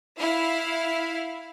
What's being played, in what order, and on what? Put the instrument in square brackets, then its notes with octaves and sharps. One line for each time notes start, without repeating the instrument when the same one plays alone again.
[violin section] E4 F5